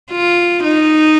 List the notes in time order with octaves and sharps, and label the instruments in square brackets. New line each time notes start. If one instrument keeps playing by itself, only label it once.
[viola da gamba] F4
D#4